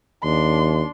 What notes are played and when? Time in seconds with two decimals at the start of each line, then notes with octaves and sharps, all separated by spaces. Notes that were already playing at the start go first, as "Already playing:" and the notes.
0.23 D#2 D4 C6